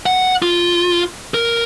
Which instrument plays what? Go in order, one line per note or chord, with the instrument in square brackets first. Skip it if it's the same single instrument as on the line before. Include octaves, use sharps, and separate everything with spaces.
[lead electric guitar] F#5
F4
A#4